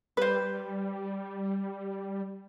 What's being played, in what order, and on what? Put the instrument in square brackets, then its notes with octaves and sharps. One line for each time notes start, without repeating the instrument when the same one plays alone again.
[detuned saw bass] G3 [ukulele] B4 C5